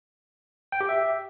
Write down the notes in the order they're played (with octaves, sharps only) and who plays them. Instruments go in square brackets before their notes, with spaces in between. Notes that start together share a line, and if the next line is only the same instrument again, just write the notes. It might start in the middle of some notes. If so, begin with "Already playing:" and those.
[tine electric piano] G5
G4
E5